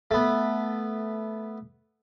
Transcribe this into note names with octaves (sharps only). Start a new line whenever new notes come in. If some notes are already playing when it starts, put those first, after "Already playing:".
A3 B3